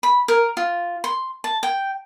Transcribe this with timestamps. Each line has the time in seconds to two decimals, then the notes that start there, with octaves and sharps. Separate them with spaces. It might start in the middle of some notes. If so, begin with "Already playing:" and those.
0.03 B5
0.28 A#4
0.57 F4
1.04 C6
1.44 A5
1.63 G5